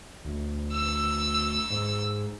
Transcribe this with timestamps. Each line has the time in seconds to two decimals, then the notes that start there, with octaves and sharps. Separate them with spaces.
0.25 D2
0.73 E6
1.70 G#2